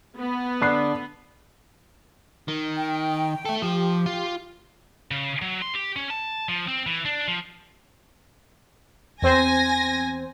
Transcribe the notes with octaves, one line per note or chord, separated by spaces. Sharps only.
B3
D3 D4 B5 F#6 C7
D#3
G5
A4 E5
F3 G4
F4
C#3
F#3
C6
G4
C#4
A5
F3
C4
E3
D4
F3
E2 C4 C5 G#5 A#6